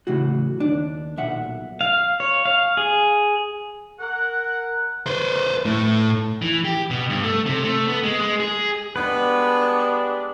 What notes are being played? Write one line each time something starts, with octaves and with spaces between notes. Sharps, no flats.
A2 C#3 E3 F#3 F#4
D#2 D4
B1 A#2 E5 F#5
F5
C#5
F5
G#4
A#4 F#5
B4 C5
A2
E3
G4
B2
G2
A3
C3
A3
B3
G#3
G#3
G#4
G3 G#3 B3 D4 B4